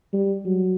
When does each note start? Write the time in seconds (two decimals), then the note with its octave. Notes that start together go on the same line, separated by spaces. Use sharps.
0.13 G3
0.45 F#3